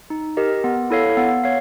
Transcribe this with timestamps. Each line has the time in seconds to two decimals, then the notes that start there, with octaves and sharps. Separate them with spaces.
0.10 D#4
0.37 G4 A#4 D#5
0.64 B3
0.90 E4 A4 C#5 F5
1.17 B3
1.44 C#5 F5